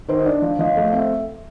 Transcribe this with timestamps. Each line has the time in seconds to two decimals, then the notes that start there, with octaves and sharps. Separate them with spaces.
0.08 D#3 C5
0.19 D#5
0.25 D4 D5
0.42 F3
0.59 F3 D#5
0.76 A3
0.92 C4 E5